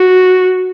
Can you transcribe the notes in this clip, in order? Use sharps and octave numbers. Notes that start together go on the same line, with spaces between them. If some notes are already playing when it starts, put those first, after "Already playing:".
Already playing: F#4